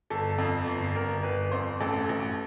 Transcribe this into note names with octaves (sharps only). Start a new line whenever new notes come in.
G1 A4
F2
G1
G1 A#4
G1 B4
F2 C5
A1 A4
A1